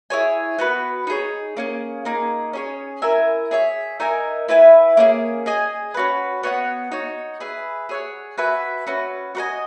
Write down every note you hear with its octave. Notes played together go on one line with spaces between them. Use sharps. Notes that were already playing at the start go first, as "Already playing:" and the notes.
E4 G#4 C#5 G#5
B3 F#4 B4
D#4 G#4 C#5
A#3 C#4 G#4
A#3 D#4 G#4
C#4 G#4 C#5
E4 A#4 E5 G#5
G#4 C#5 E5
D#4 A#4 E5 G#5
E4 B4 E5 G#5
A#3 C#4 E4 G#4
G#4 D#5 G#5
C#4 F#4 B4
B3 F#4 C#5 F#5
D#4 F#4 C#5
G#4 B4 E5
G#4 C#5 F#5
F#4 B4 E5 G#5
C#4 F#4 B4
F#4 B4 D#5 G#5